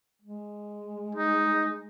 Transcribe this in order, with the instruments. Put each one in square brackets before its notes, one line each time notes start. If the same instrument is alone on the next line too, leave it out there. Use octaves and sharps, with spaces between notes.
[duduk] G#3
[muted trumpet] D#4